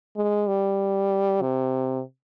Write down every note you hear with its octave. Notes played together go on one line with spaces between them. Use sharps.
G#3
G3
C3